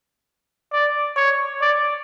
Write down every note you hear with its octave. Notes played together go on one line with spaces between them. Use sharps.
D5
C#5
D5